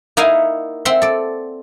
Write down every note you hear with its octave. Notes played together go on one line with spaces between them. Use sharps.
A#3 D#4 E4 F5 F#5 G#5
C4 E5 F#5 C6
A4 D5